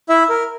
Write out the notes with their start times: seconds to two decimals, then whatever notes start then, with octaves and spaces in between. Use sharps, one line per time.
0.09 E4 E5
0.29 A#4